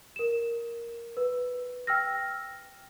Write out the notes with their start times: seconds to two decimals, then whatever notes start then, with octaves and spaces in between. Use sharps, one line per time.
0.16 A#4 E7
1.17 B4
1.87 G5 E6 F6 A#6